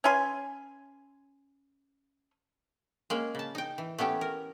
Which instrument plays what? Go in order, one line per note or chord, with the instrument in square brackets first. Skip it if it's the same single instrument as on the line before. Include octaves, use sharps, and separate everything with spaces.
[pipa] C#4 B4 G#5 C6
[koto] G#3 A#3 C#4
C#3 A5
D#4 G5
E3
A3 B3 C#4 G4
A#4